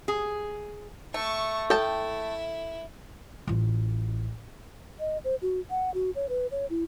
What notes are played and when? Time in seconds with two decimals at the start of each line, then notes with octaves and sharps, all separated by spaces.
0.08 G#4
1.14 A3 A5 C#6
1.70 E4 A4 E5 G5 A5
3.47 A1 F4
5.00 D#5
5.24 C5
5.42 F#4
5.70 F#5
5.94 F#4
6.15 C#5
6.29 B4
6.51 C#5
6.70 E4